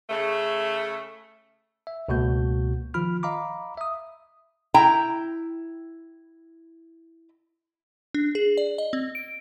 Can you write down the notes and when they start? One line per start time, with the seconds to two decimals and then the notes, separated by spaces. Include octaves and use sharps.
0.10 C#3 A3
1.87 E5
2.08 C#2 B2 A#3 F#4 G6
2.94 D#3 F3 F4 B5 F6
3.23 D#5 F5 A#5 B5 D6
3.78 E5 D#6
4.74 E4 G5 A#5
8.14 D4
8.35 G#4
8.57 D5
8.78 D#5
8.93 C4
9.15 D7